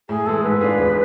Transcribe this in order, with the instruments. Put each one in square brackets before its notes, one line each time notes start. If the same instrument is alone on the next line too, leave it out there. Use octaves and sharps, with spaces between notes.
[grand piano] A2 [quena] G#4
[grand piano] E3 G#3 [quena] A4
[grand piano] G#2 [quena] B4
[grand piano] G#3 D4 F4 G#4
E1